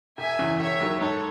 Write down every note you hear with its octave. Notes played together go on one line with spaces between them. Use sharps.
E1 E5 G#5
E2 C#3 E3
E1 C#5 E5
D#2 D#3 F#3
G#2 A4 C#5